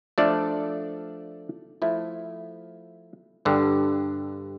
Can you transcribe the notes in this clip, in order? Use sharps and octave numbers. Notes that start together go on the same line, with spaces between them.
F3 A3 D4 A4 D5
F3 A3 E4
G2 D3 G3